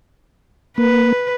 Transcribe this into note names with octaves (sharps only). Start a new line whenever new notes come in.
A#3 B4